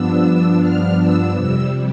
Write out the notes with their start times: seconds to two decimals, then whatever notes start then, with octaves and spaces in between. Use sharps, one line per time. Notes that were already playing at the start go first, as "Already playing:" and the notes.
Already playing: G2 F3 B3 D4 E6
0.61 F6
0.98 E6
1.35 F2 C3 G3 E6